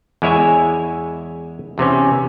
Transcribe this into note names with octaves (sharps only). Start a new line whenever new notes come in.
E2 G#3 E4 C#5 E5 G#5
E2 C3 E3 C#4